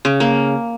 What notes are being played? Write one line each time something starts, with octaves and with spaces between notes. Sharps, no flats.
C#3
A#3